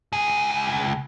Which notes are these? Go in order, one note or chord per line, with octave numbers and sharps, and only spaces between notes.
C#2 G#4